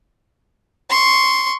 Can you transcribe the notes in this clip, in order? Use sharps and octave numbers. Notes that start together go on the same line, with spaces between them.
C6 C#6